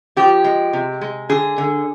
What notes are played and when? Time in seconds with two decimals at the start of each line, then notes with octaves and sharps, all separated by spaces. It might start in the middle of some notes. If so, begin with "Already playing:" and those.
0.16 F3 G4
0.44 G#3
0.73 C3
1.01 G#3
1.29 D3 G#4
1.58 D3